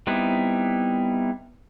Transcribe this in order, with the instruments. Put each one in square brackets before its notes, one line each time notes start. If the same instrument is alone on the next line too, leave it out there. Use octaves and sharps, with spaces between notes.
[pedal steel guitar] G3 B3 C4 D#4 E4